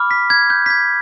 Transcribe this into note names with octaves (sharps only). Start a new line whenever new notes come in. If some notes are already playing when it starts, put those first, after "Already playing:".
Already playing: B5 D6 F6
B6
G#6
G6
B6
G#6